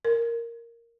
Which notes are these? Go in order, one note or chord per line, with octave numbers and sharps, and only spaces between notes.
A#4